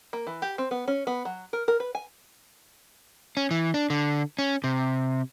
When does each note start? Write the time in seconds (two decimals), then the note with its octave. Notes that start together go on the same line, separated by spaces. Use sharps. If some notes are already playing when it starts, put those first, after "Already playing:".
0.13 A#3
0.27 E3
0.42 G4
0.58 C4
0.71 B3
0.88 C#4
1.07 B3
1.25 F#3
1.53 A#4
1.68 A#4
1.80 B4
1.95 G#5
3.37 C#4
3.51 E3
3.74 D4
3.90 D3
4.39 C#4
4.64 C3